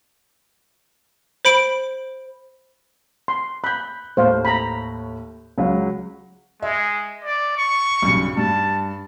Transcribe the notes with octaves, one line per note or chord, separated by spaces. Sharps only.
C5 B5 D7
C6
B5 F#6 G6
D#2 A2 C5 F5
A#5 B5
C#2 F#3
G#3 E5
D5
C#6
B1 G2 C#3
G2 A5